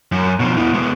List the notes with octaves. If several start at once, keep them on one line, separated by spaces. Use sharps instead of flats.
F#2
B2 F3
B2 E3
G#3 B3